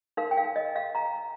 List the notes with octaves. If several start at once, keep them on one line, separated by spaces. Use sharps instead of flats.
D#4 A#4 F5
G5
F5
D#5
F5
A#5